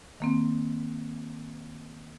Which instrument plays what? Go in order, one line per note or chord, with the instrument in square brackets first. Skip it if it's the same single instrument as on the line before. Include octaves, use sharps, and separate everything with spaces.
[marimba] D#3 A#3 C4